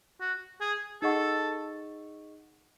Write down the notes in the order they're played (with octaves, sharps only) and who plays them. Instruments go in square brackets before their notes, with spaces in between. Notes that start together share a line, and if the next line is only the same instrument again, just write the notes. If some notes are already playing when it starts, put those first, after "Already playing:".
[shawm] F#4
G#4
[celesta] D#4 G#4 D#5 F#5 C#6 [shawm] A4